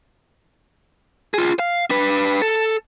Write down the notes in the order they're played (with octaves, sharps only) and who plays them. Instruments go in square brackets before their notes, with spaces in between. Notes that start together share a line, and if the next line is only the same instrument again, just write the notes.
[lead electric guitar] F4 G#4
F5
D4 B4
A4